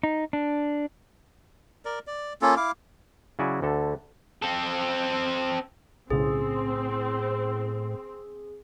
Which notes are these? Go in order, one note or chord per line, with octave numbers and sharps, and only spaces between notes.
D#4
D4
A#4 D5
D5
A#3 C#4 F4 A4
E4 F5 D6
C#3 F#3 E4 F#4 D5 G#5
D2 D3 A4
C4 A4
B1 A2 C#3 C4 G#4